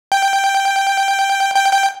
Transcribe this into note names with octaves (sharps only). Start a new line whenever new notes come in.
G5
G5
G5